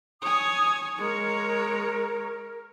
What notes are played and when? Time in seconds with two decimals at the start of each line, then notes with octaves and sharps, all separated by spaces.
0.22 C#5 G#5 D#6
0.98 G#3 A#4 C#5